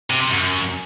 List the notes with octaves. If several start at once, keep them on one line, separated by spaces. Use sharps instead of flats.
C3
C3
F#2